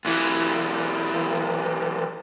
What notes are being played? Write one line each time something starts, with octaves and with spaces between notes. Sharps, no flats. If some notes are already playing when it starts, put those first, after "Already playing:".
B1 E3